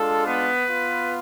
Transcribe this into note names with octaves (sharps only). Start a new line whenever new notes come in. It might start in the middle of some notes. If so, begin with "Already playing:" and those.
Already playing: G#3 D4 F4 A4
B3 B4
B3 F4